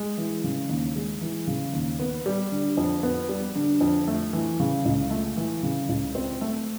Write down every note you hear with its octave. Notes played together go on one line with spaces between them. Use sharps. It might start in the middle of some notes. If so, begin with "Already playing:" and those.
Already playing: G#3
E3
C#3
D#2
G#3
E3
C#3
D#2
B3
G3
D3
F2
B3
G3
D3
F2
A3
E3
C#3
C#2
A3
E3
C#3
C#2
C4
A3